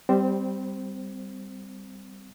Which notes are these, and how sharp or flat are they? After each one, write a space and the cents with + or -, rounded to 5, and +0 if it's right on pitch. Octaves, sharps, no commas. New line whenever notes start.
G3 +0 C4 -20 C5 +15